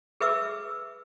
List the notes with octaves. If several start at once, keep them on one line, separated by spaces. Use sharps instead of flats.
G#4 B4 E5 D6 E6